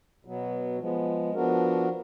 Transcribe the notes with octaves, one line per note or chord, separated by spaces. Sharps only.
B2 F#3 B3
F3 G#3 B3
F3 B3 D4 F#4 A#4